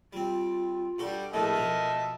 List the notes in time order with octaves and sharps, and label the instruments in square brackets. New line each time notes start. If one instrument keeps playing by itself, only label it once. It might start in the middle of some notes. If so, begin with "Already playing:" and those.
[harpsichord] G3 C4 [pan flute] F4
[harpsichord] G2 F#4 A4 [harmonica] G3
[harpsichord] A#1 A2 A3 [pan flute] A#4 [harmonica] D#5 E5 A5
[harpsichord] B2 F3